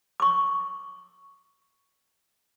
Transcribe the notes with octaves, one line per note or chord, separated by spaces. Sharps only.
C#6 D6